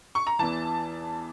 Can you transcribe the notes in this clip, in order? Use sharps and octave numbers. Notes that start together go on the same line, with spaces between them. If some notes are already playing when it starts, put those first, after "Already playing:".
C#6
A#5
E2 E3 A5